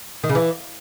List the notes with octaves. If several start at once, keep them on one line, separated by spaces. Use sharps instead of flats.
D#3
C#3
E3